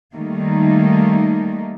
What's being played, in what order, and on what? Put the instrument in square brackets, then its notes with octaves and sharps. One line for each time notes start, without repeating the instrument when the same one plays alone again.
[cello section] D#3 G3 A3 A#3 D#4